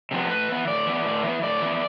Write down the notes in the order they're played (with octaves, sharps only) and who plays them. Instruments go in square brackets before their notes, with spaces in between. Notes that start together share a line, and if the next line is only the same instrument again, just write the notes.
[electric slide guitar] C3 F3 B3
A2 B4
E3 B3
A2 D5
E3 B3
A2
E3 B3
A2 D5
E3 B3